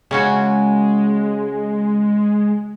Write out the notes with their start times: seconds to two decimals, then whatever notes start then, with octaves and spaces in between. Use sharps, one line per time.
0.11 C#3 G#3 C#4 F#4